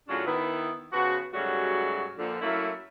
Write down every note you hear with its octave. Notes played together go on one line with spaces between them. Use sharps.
A2 C#3 F#3 C#4 D4 F4
D#3 B3 E4
C#3 F3 B3 F#4
G#2 C#3 F#3 G3 A3 F#4
A#2 D3 F3
F#3 A3 A#3 C#4 E4